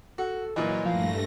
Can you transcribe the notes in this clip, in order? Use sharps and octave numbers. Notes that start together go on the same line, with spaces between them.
F#4 A4
A#2 E3 F#3 F4 D#5
G2 F3 A3 F5 A#6